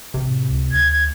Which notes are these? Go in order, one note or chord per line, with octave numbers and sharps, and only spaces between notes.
A1 C3
A2
C#2
D2 G#6